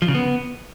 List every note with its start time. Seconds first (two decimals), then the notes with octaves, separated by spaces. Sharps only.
0.02 F3
0.08 C#3
0.14 B3